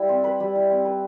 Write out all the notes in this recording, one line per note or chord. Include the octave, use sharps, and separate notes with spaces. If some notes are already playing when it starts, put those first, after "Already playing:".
Already playing: G3 E4
C4
B4
G3
E4
C4
B4